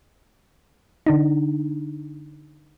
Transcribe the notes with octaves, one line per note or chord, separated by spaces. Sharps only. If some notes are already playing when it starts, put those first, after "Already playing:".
D3 D4 D#4